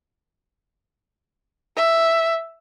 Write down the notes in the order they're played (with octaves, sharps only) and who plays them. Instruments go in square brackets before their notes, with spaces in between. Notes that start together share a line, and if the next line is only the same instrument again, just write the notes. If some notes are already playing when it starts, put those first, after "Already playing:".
[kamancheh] E5